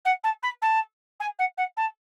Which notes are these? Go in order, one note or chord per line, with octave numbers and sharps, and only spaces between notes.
F#5
A5
B5
A5
G#5
F#5
F#5
A5